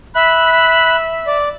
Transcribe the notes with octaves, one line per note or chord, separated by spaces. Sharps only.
E5 B5 F#6
D5